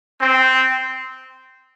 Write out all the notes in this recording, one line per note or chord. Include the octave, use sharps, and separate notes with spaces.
C4